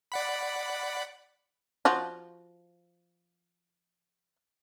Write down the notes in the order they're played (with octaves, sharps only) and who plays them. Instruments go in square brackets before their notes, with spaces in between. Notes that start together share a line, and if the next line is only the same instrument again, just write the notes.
[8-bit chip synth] D5 F#5 B5
[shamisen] F3 F4 F#4